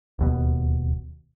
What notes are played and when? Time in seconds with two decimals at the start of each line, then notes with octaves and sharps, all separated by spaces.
0.19 D1 D#2 B2